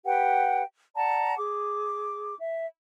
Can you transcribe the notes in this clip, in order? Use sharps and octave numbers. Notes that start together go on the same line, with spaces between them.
G4 B4 F#5 G5
D5 F#5 A5 A#5
G#4 D6
E5